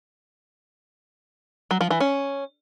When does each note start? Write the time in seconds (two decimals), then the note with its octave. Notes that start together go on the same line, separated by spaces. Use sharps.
1.71 F#3
1.81 F3
1.91 E3
2.00 C#4